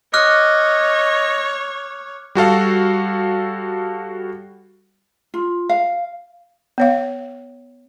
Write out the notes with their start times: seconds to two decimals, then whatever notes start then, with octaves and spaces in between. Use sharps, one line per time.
0.14 C#5 D#5 D6 F6 F#6
2.35 G3 F#4 A4 F5
5.34 F4
5.69 F5
6.78 B3 C#5 F5